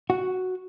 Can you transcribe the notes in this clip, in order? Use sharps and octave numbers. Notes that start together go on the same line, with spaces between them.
F#4